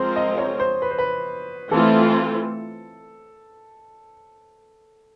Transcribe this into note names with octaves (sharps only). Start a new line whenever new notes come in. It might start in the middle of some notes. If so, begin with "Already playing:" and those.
Already playing: F3 G#3 C4 F4 A#4 C5
D#5
C#5
C5
B4
C5
B4
E3 A3 C4 F4 A4